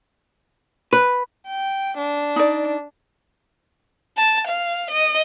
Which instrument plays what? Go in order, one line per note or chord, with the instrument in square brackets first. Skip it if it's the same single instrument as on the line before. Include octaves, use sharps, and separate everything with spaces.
[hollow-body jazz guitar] B4
[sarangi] G5
D4
[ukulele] D#4 D5
[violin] A5
F5
D#5